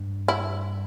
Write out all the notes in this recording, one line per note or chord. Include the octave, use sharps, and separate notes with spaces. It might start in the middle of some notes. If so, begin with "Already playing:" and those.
Already playing: G2
E4